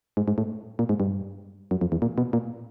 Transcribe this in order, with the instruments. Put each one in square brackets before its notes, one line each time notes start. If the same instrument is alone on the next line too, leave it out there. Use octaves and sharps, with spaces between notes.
[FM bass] G#2
G#2
A2
A#2
G#2
G2
F#2
F2
E2
A#2
B2
A#2